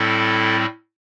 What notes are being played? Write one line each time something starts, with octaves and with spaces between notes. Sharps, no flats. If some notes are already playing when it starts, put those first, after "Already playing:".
Already playing: A2 G3 C4 E4 A4